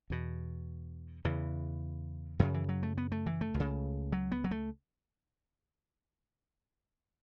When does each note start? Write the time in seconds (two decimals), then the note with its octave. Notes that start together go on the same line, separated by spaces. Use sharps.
0.10 E2 B2
1.25 E2 C#3 E3
2.39 F#2 C#3 F#3
2.54 E3
2.69 F#3
2.83 A3
2.98 B3
3.12 A3
3.26 E3
3.41 A3
3.54 C#2
3.60 C#3
4.12 F#3
4.32 B3
4.44 F#3
4.51 A3